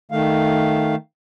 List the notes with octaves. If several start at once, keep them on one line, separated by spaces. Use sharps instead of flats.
D#3 A3 F5